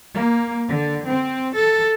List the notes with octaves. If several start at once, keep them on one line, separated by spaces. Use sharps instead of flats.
A#3
D3
C4
A4